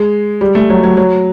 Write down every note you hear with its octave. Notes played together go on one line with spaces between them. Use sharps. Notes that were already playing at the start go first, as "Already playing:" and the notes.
Already playing: G#3
G3
A3
F#3
F#3
F#3